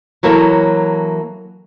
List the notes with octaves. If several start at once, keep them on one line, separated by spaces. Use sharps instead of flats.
E3 F#3 A#3 A4 C#5